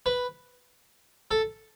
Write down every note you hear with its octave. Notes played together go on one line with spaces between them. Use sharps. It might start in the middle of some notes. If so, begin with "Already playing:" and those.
B4
A4